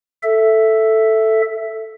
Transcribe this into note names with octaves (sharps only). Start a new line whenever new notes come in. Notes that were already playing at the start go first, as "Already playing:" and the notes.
A4 E5